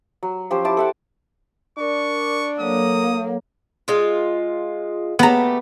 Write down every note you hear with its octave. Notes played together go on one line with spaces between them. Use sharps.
F#3
F3 C#4 G4 C5
E4 C5 A5 D6
A4 E5 F#5
D4 A#4 D5 C#6 D6
F#3 A#3 A4 C#5 D#6
G#3 F4
A3 B3 G4 A#5